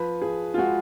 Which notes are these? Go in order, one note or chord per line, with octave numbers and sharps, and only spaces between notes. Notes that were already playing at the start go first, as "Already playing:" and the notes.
Already playing: F3 B4
F3 G#4
F4
G#3 F#4